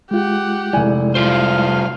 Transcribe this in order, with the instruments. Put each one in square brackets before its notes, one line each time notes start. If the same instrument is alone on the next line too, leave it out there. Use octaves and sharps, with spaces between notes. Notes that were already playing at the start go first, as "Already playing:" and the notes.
[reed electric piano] G#3 F4 [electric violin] G4 F#5
[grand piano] F1 G#5 [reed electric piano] G#3 E4 D5
[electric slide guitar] G3 F4 C5 [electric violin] F5